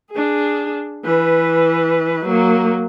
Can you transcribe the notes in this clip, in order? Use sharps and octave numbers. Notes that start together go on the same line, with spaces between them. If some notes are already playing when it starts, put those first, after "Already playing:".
D4 G#4
E3 B4
F#3 A#3